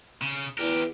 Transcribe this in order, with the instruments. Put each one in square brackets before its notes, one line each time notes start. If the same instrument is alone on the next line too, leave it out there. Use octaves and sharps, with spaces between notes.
[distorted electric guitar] C#3
[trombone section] E2 [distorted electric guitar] G4 A#4